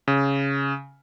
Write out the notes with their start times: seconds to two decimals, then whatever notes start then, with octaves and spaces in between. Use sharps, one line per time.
0.08 C#3